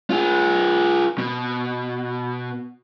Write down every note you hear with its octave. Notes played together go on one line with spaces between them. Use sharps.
F4 G#4
B2